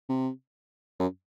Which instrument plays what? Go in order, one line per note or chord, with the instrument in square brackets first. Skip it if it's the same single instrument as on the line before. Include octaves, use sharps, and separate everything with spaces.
[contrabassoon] C3
F#2